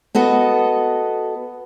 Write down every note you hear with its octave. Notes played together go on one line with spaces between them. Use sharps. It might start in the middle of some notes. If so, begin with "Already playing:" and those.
B3 F#4 A4 D#5